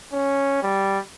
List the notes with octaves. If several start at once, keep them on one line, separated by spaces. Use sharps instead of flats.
C#4
G3